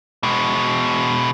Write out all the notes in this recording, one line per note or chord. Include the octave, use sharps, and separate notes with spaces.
B2 G#3